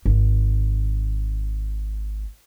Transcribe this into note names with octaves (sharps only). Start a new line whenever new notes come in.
G#1 D#3